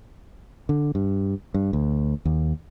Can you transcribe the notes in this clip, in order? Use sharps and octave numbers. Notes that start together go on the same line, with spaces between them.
D3
G2
G2
D2
D#2